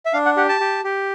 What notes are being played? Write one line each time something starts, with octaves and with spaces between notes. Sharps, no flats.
E5
D4 F5
F#5
G4 F#5
A5
G4
G4